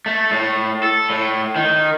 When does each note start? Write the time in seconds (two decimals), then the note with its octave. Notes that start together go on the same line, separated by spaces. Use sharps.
0.06 A3
0.31 A2
0.83 A4
1.10 A2
1.56 D#3